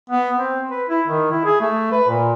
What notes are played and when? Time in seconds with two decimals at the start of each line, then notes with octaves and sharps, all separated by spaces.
0.10 B3
0.37 C4
0.71 B4
0.89 E4
1.07 D#3
1.31 E4
1.45 G#4
1.60 A3
1.92 B4
2.08 A#2